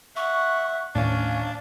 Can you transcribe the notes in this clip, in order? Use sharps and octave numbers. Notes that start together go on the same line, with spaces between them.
E5 F#5 C#6
D#2 A2 C#4 D4 F5